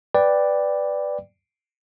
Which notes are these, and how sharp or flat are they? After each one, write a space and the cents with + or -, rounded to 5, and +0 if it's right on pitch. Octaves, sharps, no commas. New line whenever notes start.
B4 +5 D5 +0 G5 +0